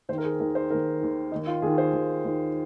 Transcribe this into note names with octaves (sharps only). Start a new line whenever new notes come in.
D#2 D#3 C5
A#4
G#4
D#2 D#3 A#4
C5
D#2 D#3 A#4
D#2 D#3
D#2 D#3 D#4
F4
D#2 D#3 G#4
C5
D#2 D#3
D#2 D#3